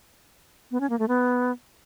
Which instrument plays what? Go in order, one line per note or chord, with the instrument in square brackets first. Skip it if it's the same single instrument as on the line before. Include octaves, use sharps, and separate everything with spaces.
[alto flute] B3
C#4
A#3
A3
B3